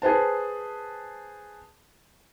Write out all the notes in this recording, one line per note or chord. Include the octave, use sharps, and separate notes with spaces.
G#4 B4 C5 A5